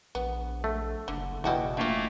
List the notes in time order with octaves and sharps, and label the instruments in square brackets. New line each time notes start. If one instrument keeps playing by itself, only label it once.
[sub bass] A#1 [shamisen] B3
[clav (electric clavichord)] A3
[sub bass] F#1 [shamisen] D3
[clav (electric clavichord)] E2 B2 [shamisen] G3 F#4 G4
[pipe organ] A3 A#3 [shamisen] D4 F4